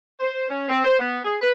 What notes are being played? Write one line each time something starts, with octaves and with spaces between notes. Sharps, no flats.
C5
C#4
C4
C5
B3
G#4
B4